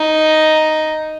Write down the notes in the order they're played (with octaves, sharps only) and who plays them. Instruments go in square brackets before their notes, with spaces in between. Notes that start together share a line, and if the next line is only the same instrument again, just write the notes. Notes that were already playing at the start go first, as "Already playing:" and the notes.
Already playing: [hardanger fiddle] D#4